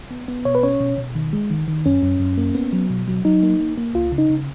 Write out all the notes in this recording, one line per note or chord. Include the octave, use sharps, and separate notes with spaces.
B3
B3
B2 C#5
B4
C#4 C#5
B2
B2
D#3
G#3
D#3
D#3
F#2 C#4
F#2
F#2
A#3
B3
F#3
B2
F#3
F#3 D#4
A#3
A#3
A#3
C#2 F4
C#3
D#4
C#3